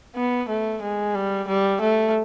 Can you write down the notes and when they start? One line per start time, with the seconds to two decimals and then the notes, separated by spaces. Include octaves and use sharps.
0.16 B3
0.49 A3
0.82 G#3
1.15 G3
1.48 G3
1.81 A3